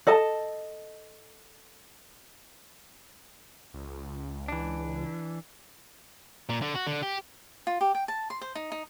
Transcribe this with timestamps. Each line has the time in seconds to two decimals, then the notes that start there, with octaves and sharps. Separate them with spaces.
0.07 A4 D#5 A5
3.74 C#2
4.48 E3 D4
6.49 A#2
6.62 D3
6.75 F#4
6.87 D3
7.02 G4
7.67 F4
7.81 G4
7.95 G5
8.08 A5
8.30 C6
8.41 C5
8.55 D#4
8.72 D#4